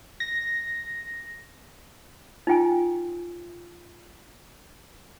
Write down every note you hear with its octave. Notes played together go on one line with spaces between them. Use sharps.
A#6
D#4 F4 G5 G#5